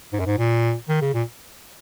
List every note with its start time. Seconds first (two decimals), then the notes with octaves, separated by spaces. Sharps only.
0.13 G#2
0.19 F#2
0.26 G#2
0.38 A#2
0.89 D#3
1.01 C#3
1.14 A#2